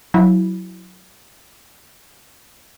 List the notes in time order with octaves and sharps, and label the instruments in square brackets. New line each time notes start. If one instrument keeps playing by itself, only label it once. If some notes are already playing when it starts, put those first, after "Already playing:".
[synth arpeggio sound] F#3 E4